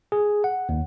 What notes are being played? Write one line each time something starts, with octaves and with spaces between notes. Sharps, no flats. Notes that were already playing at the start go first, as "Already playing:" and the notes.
G#4
F#5
D#2